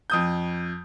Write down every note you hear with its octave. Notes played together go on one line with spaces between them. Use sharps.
F2 D#6 G6